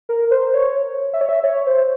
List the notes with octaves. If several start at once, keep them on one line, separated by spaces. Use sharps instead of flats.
A#4
C5
C#5
E5
C#5
E5
C#5
C5